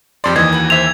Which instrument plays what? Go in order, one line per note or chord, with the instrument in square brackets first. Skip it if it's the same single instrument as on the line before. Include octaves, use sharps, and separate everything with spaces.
[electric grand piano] F2 D5 [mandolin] G4 C6
[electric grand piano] D#2 E3 [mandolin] D#5 E5 [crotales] G#6
[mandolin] F#4 B4
[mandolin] C5 E5 [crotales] F7